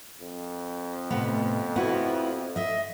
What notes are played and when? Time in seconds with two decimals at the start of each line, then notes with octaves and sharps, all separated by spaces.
0.20 F2
1.11 A2 C3 B3
1.76 B3 E4 F#4
2.56 D#5 E5